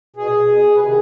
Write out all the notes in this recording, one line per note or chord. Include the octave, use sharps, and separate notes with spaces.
B2 G#4
B2
B4
C3 D#3 G#4